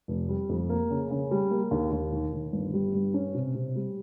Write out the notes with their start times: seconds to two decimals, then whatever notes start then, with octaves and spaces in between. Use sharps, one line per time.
0.08 F1
0.29 G3
0.49 F2
0.70 A#3
0.90 C#3
1.11 C#3
1.31 G3
1.51 A#3
1.71 D#2
1.92 D#2
2.12 D#3
2.33 D#3
2.52 G1
2.74 G3
2.94 G2
3.14 C#4
3.34 C3
3.55 C3
3.76 G3